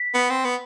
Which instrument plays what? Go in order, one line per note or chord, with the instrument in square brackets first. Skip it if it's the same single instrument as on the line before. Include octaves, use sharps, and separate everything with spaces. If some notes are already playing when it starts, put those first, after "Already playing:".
Already playing: [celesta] B6
[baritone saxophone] B3
C4
B3